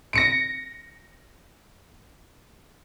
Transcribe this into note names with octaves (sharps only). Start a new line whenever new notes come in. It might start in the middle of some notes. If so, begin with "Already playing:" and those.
A#6 C#7 D7